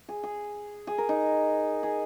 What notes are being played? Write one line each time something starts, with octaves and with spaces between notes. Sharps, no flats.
G#4
G#4
G#4
A#4
D#4
G#4